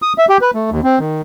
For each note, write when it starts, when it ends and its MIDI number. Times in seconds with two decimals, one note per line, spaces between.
0.02 0.13 87
0.18 0.25 76
0.29 0.38 67
0.41 0.51 71
0.54 0.70 57
0.71 0.80 39
0.84 0.99 60
1.00 1.21 51